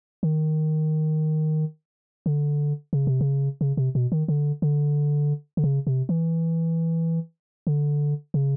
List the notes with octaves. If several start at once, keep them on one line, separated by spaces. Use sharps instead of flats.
D#3
D3
C#3
C3
C#3
C#3
C3
B2
D#3
D3
D3
D3
C#3
C3
E3
D3
C#3